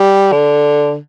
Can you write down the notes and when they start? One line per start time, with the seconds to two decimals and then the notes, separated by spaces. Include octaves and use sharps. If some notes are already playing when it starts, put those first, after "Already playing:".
Already playing: G3
0.32 D3